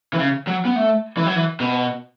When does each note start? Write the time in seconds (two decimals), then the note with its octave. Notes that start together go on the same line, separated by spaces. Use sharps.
0.14 E3
0.19 C#3
0.47 F#3
0.65 B3
0.76 A3
1.17 E3
1.26 F#3
1.36 E3
1.60 B2